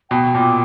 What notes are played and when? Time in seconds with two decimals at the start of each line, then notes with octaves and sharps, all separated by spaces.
0.11 B2 G5
0.34 A#2